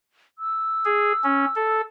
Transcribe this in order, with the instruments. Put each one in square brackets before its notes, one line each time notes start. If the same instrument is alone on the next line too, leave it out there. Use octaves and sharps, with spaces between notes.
[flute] E6
[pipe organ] G#4
C#4
A4